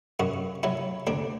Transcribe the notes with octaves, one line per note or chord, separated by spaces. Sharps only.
F#2 F#4
F#3 E4
D2 D4